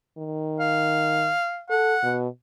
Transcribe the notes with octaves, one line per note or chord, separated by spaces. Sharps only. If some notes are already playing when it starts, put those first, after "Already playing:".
D#3
F5
A4 F#5
B2